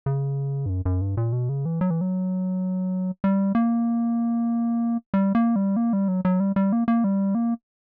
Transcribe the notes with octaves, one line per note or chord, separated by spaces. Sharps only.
C#3
G2
F#2
F#2
G2
A#2
B2
C#3
E3
F#3
E3
F#3
G3
A#3
G3
A#3
G3
A#3
G3
F#3
F#3
G3
G3
A#3
A#3
G3
A#3